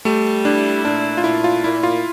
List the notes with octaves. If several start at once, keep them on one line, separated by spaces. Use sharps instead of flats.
G3 A3
D4 E4
A#2 D4
F4
A#2 E4
F4
A#2 E4
F4